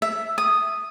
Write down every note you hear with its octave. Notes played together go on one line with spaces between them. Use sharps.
E5
D#6